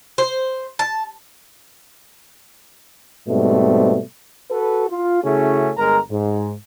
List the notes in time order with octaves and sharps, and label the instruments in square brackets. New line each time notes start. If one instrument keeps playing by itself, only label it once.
[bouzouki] C5
A5
[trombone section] G#2 B2 G3 A3 C4
[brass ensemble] F#4 A4 B4
F4
C#3 A3 C#4 E4 F#4 G#4
G1 G#3 A#4 A#5
G#2